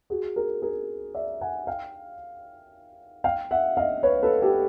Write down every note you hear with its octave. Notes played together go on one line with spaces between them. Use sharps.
F#4 G#4
G#4 A#4
G#4 A#4
D5 E5
F#5 G#5
F5 G5
F5 G5
E5 F#5
D#5 F5
B4 C#5
A4 B4
G4 A4